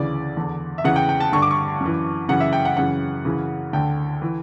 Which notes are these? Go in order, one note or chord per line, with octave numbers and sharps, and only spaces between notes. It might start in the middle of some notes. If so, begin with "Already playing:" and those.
Already playing: D2 C#3 E3 D5
E2 D3
E5
E2 C#3 E3 F#5
G5
G5
A5
G2 D3 C#6
D6
C#6
F#2 E3
F#2 C#3 E3 F#5
E5
G5
F#5
F#2 C#3 E3 F#5
F#2 C#3 E3
D2 D3 G5
E3